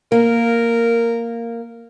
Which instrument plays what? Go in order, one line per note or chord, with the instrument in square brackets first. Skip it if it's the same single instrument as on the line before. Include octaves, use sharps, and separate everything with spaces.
[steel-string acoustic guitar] A#3 [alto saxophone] A#4